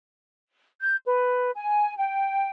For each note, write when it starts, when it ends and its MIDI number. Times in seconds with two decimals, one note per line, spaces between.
0.81 0.96 91
1.05 1.50 71
1.56 1.96 80
1.97 2.50 79